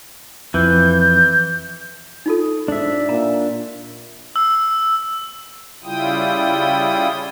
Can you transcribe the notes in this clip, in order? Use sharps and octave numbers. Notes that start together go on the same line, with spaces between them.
F2 E3 G6
D#4 F4 A4
G#2 D4 E5
A#2 A#5
E6
C#3 G3 E4 F4 G5 D#6